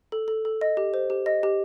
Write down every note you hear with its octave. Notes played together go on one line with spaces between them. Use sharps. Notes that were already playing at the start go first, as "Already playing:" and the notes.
A4
A4
A4
D#5
G4
C5
G4
D#5
G4